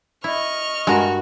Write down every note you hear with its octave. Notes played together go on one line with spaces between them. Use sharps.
E4 D#5 C#6 F6
G2 G#3 F#4 A#4